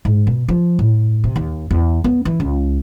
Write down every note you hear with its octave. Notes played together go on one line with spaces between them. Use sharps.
G#2
B2
F3
A2
C3
D#2
E2
B3
E3
C#2